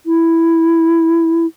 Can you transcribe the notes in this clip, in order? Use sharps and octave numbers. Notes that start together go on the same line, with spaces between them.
E4